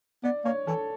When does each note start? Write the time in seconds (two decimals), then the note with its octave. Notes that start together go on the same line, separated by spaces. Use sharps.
0.23 B3 D5
0.45 A#3 C#5
0.67 E3 A4